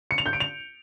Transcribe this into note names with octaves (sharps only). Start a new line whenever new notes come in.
C#7
F7
G6
D7
F7